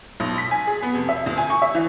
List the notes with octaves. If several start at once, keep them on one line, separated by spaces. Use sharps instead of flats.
B1
B6
G#5
G#4
B3
F1
E5
D2
G#5
C#6
E5
E3